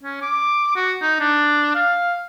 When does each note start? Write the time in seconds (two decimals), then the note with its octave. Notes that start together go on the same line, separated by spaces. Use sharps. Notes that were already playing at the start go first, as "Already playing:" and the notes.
0.03 C#4
0.22 D6
0.76 F#4
1.02 D#4
1.20 D4
1.75 F5